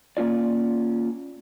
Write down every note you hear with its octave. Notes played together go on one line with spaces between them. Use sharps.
A#3 C#4 F4 D5